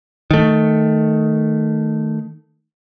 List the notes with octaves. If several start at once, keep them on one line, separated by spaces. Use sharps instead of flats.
D#3 A3